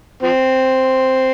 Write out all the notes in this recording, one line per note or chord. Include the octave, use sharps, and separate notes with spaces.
F3 C4